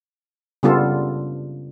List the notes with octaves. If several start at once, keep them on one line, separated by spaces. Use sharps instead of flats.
C#3 G3 B3 D4 F4 A4